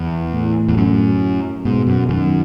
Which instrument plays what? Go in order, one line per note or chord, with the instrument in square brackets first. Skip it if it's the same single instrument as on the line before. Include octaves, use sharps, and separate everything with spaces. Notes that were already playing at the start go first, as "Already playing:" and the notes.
Already playing: [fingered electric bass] E2
[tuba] A2
[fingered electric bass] E2
F#2
[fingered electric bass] G#2 [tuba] B2
[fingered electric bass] F#2
[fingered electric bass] F#2 [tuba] D#3